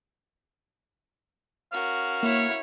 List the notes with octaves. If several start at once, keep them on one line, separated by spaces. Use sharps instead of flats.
C#4 F#4 A#4 F5
A#3 E4 C#5